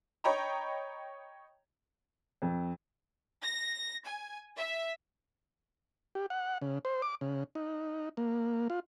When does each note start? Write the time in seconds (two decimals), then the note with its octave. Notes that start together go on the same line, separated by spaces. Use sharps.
0.24 C#5 D#5 G5 A#5 B5
2.42 F2
3.42 A#6
4.06 G#5
4.57 E5
6.15 G4
6.30 F#5
6.62 C#3
6.85 C5
7.02 D6
7.21 C#3
7.55 D#4
8.17 A#3
8.70 F4